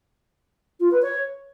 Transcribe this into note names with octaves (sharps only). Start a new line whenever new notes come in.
F4
B4
C#5